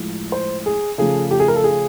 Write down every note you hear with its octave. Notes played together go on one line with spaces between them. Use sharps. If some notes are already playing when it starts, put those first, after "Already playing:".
Already playing: A2 F3 G#3
C5
G#4
C#3 F3 A3 G#4
G4
G#4
A#4
A4
G#4